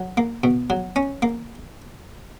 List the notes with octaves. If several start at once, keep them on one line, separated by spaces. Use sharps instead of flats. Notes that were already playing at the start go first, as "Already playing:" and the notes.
Already playing: F#3
A#3
B2
F#3
C#4
A#3